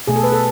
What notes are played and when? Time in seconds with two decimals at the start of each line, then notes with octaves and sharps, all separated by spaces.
0.07 B2 A3 G#4
0.16 A4
0.23 B4
0.32 A4